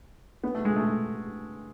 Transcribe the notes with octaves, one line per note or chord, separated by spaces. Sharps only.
B3
A3
G#3
A3